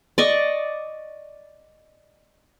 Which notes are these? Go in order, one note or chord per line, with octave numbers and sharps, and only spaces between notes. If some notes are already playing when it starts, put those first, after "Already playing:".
D5 D#5 C#6